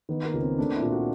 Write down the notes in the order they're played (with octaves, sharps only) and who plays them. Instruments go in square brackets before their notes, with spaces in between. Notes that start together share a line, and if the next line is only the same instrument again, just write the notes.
[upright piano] D#3 [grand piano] B3
[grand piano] A#3
[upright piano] C#2
[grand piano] C4
[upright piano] A3 [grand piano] D4
[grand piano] E4
[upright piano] A#2
[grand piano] F#4